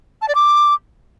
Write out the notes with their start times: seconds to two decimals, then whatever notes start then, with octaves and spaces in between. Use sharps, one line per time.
0.22 A5
0.28 D5
0.35 D6